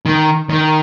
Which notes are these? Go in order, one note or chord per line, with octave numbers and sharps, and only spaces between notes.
D#3
D#3